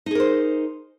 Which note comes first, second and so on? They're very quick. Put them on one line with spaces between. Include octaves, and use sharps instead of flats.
D#4 G#4 A#4 C5